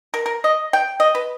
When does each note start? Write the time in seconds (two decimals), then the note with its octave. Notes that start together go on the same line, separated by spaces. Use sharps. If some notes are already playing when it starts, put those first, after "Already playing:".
0.14 A#4
0.26 A#4
0.44 D#5
0.73 G5
1.00 D#5
1.15 B4